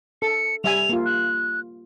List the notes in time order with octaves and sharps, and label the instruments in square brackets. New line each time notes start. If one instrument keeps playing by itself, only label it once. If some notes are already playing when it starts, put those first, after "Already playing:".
[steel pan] A4 [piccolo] C#7
[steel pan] G3 E5 G#5 [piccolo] F7
[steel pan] A#3 F4
[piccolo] F#6